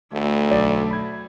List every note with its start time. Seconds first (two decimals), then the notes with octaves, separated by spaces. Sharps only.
0.13 D2 A3
0.50 B1 D5
0.91 B5 G#6